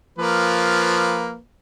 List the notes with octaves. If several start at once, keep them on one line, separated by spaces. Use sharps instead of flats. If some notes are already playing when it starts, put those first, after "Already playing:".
F3 A#3 B4